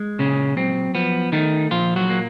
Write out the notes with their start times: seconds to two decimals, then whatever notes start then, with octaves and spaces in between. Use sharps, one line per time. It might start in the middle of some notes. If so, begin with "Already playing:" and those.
Already playing: G#3
0.19 A#2 C#3 C#4
0.57 F#3 C4
0.95 F3 B3
1.32 D#3 A3 D#4
1.71 A#2 F3 F4
1.96 F#3 F#4
2.10 A#3